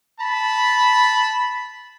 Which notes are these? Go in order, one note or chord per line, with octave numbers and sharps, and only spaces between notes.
A5 B5